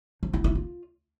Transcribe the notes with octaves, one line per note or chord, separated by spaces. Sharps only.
F3
E4
E4
F4